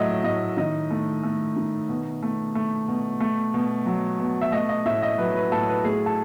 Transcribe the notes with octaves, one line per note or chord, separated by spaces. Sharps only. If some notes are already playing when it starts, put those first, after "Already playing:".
Already playing: A2 F#3 A3 D#5 E5
A2 D#5
D#3 D#5
A3
A3
D#3
B2
A3
A3
B2
A3
B2
F#3
B2
E5
A3 D#5
D#5
A2 E5
D#5
F#3 B4
B4
A2 A4
B4
A3 G#4
A4